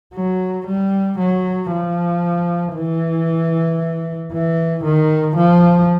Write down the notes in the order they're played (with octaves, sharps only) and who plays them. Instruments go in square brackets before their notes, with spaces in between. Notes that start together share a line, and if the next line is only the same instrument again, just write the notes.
[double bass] F#3
G3
F#3
F3
E3
E3
D#3
F3